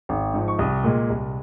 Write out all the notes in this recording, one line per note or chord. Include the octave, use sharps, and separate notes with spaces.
G#1
G#2 F3
C#6
C2 D#6
A#2 G#3
C2